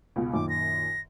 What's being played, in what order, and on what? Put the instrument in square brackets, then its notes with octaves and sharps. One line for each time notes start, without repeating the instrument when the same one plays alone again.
[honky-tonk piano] C#2 B2
[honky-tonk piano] F#2 A#2 D#3 [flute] D6
[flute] A#6